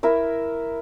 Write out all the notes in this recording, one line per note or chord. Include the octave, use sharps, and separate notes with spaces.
E4 A#4 E5